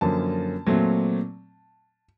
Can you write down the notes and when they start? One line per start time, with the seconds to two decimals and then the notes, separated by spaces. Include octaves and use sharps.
0.01 F#2 D3 F3 A#3 C#4 A5
0.67 A#2 F#3 A3 C4